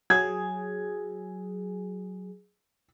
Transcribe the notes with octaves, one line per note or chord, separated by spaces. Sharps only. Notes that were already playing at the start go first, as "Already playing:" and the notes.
F#3 G#4 G#6